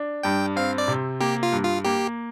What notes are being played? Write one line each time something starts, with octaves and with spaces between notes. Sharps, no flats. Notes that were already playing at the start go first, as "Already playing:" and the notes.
Already playing: D4
G2 G5
C4 F5
D5
C3
A#3 G4
F4
G2
F4
A#3 G4